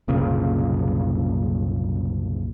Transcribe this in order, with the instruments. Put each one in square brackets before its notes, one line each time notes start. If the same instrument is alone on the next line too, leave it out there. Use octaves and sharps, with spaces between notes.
[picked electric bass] F#1 C2 A#2 C#3